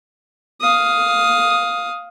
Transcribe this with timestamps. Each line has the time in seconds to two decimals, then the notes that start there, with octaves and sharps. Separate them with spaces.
0.61 F5 D#6